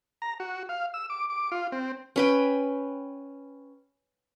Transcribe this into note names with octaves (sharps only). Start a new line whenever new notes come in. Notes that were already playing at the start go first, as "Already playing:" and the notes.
A#5
F#4
F5
E6
D6
D6
F4
C4
C#4 B4 G5